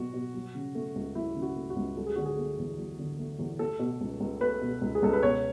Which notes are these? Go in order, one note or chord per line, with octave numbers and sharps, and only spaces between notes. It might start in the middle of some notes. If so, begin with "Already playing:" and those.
Already playing: B2 F#3 F#4
B2
F#3
C#3
A3
C#2
F#3 E4
C#3
F#4
A3
F#4
C#2
F#3 A4
G#4
D3 F#4
G#4
A3
E2
F#3
D3
A3
E2
A3 A4
B2
C#2
C#2
A3 B4
B2
C#2
G#4
C#2 A4
B4
B2 C#5